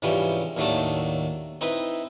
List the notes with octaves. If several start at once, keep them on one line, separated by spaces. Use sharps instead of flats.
G#2 C3 E3 F3 G3 C#4
D#2 A2 D#3 F#3 A3 D4
C4 D#4 E4 B4